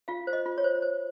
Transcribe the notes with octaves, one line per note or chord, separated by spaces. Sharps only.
F4 F5
C5
D#5
F4
C#5
C5
C5